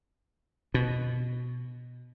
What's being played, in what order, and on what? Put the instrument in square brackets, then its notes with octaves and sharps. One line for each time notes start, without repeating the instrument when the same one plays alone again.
[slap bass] B2